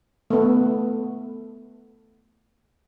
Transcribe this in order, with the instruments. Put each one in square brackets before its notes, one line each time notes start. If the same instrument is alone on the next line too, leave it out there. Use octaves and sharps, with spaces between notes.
[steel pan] A3 B3